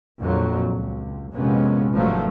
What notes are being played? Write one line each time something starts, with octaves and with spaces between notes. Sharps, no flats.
A#1 F2 A#2 F#3
C#2
A#1 F2 C3 G#3 B3 C#4
G#1 G2 F3 F#3 A3